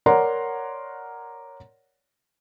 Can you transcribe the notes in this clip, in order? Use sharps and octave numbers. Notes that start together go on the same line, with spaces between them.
A#4 C#5 D5 F#5 A#5 C6